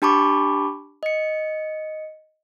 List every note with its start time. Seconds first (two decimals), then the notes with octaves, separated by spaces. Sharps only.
0.02 D4 G4 A5 B5 C#6 D6
1.03 D#5 C#7